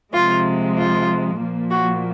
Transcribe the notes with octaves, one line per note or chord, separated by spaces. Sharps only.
C3 F3 G#3 F4
F4
A#2 F3 A#3
F#4